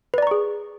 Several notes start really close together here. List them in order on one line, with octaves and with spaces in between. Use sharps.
B4 D5 A#5 C#6 G#4